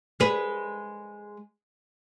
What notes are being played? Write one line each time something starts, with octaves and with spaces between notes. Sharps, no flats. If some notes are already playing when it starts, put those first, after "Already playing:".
G#3 B4